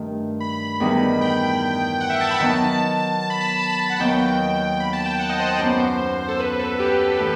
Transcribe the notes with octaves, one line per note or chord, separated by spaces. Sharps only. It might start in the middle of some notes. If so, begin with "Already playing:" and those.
Already playing: G2 D#3 A3
B5
E2 D#3 G3 D#4
G5
F#5
E5
A5
B5
D#3 F#3 B3 D#4 A5
A5
B5
A5
B5
B5
A5
A5
F#5
D#2 D#3 F#3 B3 G5
B5
A5
G5
F#5
D#5
C5
C5
F#2 F#3 B3
A4
B4
A4
G4
A2 E3